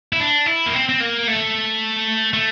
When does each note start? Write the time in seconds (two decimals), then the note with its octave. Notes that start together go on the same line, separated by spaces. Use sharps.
0.13 E4
0.20 D4
0.46 E4
0.66 A#3
0.74 C4
0.89 C4
1.00 A#3
1.27 A3
2.33 A3